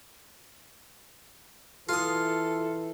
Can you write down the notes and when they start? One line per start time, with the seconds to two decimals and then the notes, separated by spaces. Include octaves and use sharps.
1.89 E3 F4 A4 D#6